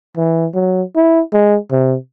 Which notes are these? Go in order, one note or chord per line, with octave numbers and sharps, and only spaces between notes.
E3
F#3
E4
G#3
C3